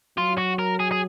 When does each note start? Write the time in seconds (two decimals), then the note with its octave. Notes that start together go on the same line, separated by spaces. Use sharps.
0.18 F#3 F4
0.38 F#4
0.59 A#4
0.80 G#4
0.92 G#4